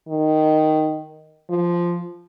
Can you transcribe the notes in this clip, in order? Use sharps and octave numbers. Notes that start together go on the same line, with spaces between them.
D#3
F3